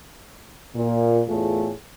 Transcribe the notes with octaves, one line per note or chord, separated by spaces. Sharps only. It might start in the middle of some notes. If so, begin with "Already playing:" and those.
A#2
E2 A2 A3 F4 G#4